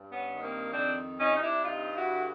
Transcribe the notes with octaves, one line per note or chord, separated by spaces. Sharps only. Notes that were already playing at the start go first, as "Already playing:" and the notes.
Already playing: G2
B3 C#4
D#3
A#3 C4
F2 C4 D4
C3 C#4 D#4
D#4
D4 E4
G2 D#4 F4
E4 F#4
D3